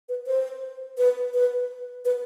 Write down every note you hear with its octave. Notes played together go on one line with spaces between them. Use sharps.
B4
C5
B4
B4
B4